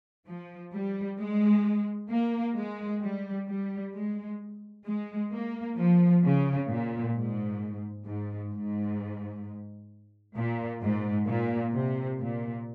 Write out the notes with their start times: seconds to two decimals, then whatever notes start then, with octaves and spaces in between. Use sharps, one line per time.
0.27 F3
0.72 G3
1.19 G#3
2.10 A#3
2.56 G#3
3.02 G3
3.47 G3
3.94 G#3
4.85 G#3
5.32 A#3
5.78 F3
6.24 C#3
6.69 A#2
7.15 G#2
8.06 G#2
8.52 G#2
10.36 A#2
10.82 G#2
11.27 A#2
11.73 C3
12.19 A#2